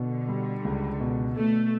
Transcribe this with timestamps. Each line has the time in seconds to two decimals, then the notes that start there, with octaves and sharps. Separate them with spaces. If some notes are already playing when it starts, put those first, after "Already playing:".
Already playing: B2 D3
0.29 G3
0.64 C#2
1.00 B2
1.36 B2 A3